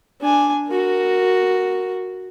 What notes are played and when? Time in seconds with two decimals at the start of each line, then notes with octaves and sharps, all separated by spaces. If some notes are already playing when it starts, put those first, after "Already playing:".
0.22 D4 G#5
0.69 F#4 A#4